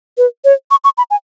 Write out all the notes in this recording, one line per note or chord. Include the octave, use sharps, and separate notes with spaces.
B4
C#5
C#6
C#6
B5
G#5